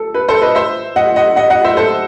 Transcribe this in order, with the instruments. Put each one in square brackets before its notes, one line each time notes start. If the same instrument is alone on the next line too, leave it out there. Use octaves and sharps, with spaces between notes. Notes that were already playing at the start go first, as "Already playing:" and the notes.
Already playing: [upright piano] A4
B4
A4 C5
B4 D#5
C5 E5
D#5 F#5
D#5 F#5
D#5 F#5
D#5 F#5
C5 E5
A4 C5